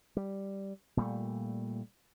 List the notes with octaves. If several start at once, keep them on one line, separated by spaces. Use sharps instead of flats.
G3
A#2 G3 A3